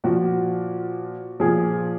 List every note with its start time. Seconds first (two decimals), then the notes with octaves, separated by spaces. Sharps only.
0.04 A#2 F3 F#4
1.40 A#2 F3 G#4